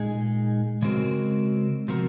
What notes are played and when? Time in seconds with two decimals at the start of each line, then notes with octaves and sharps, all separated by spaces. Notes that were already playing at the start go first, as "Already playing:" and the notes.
Already playing: A#2 G#3 D#4 G#4
0.82 C#3 G#3 C4 F#4 A#4
1.88 C3 F3 C4 F#4 A#4